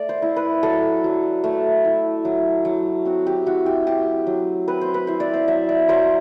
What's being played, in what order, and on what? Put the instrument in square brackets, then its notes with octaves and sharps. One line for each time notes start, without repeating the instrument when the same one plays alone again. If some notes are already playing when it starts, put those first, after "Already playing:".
Already playing: [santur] A3 D5
C5
E4
B4
F#3 A4
F#3
A3
E4
F#3
F#3
C4 F#4
G4
E4 F#4
G4
F#3 G4
F#3
C4 B4
C5
B4
E4 C5
D5
C5
F#3 E5
D5
F#3 C5